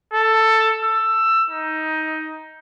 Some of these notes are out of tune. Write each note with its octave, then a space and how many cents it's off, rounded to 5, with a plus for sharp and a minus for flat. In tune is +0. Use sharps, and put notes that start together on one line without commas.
A4 +10
E6 +15
D#4 +15